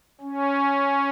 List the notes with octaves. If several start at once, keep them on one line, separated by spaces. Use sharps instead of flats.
C#4